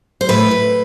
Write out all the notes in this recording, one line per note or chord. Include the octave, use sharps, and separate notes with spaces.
C5
A2 B4
A2